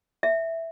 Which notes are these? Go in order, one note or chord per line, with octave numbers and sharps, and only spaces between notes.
E5